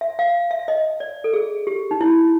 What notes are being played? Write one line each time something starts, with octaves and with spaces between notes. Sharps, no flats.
E5
F5
E5
D#5
D5
A4
G#4
G4
D#4
E4